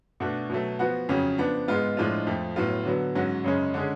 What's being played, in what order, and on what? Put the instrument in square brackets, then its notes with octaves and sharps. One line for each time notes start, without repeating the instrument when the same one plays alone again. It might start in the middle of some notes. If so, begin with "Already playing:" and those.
[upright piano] B2 A3 D4 F#4
B2 F#3 A3
F3 B3 F#4
F2 C#3 F#3 C#4
F3 B3 D4
G#2 G#3 B3 F4
A2 F3 G#3 D4 F4
F2 F3 A3
A2 F#3 B3 F4
D3 F#3 B3
G#2 F#3 C#4 F#4
F#2 C#3 G#3 C#4
D3 G#3 C#4 G#4